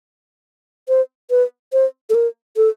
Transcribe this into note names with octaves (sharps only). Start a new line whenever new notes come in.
C5
B4
C5
A4
A#4
A4